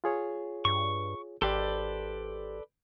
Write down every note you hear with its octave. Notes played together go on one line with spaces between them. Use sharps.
F4 G#4 C#5
G2 C#6
G#1 G4 A4 B4 D5 C6 G6